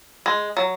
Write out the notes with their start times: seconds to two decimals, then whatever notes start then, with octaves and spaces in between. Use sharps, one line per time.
0.26 G#3
0.57 F#3